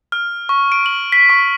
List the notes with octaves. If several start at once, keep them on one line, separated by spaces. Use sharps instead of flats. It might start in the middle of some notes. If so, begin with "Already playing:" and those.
F6
C#6
D7
F#7
B6
C#6